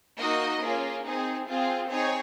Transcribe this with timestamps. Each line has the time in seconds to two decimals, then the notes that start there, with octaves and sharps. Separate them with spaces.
0.19 A#3 D#4 F#4 D#5
0.62 A#3 C#4 F4 G#4
1.04 C4 D#4 G#4
1.46 C4 F4 G#4
1.89 C4 D#4 G#4 C#5